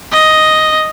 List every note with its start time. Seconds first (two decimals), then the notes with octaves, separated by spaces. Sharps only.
0.13 D#5